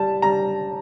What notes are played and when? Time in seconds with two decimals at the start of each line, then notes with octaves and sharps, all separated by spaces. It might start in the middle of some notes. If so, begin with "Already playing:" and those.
Already playing: G3 A5
0.22 G3 A#5